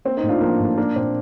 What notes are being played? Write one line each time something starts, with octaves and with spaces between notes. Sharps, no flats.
A#3 C4
C4 D#4
A2
D4 F4
F3 A#3 D4
A2
A#3 D4
A#2 C4